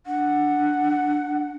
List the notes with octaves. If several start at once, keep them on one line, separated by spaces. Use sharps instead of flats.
D4 F#5